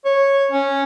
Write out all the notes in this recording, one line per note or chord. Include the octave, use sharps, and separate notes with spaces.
C#5
C#4